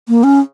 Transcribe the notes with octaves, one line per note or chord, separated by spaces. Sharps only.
A#3
C#4